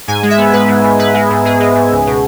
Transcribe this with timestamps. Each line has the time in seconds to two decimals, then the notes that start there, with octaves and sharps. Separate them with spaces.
0.08 G#2 G#5
0.23 G#3
0.30 E5
0.38 B3
0.53 G#2 B4
0.68 G#2
0.84 G#2
0.99 G#2 B4
1.14 G#3
1.30 G#2
1.45 G#2 G#4
1.60 G#3
1.75 G#2
1.92 C#2
2.07 B2